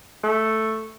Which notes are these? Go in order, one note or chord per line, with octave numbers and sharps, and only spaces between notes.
A3